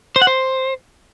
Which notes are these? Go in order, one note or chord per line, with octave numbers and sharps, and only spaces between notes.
C5
F#5
C5